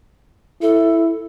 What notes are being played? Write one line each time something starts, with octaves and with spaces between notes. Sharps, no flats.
E4 A4